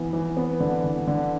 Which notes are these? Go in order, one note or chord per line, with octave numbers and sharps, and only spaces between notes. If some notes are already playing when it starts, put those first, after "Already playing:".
Already playing: E3 B3
E3
B3
D3
D3
D3